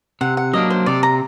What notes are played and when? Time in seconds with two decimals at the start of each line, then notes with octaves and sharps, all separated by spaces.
0.21 C3 F#5
0.37 F#5
0.53 F#3 A#3 D4 D#5
0.70 C5
0.86 C3 D5
1.03 A#5